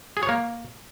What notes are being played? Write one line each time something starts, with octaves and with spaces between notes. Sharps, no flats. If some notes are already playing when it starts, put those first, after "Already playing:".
G#4
C#5
A#3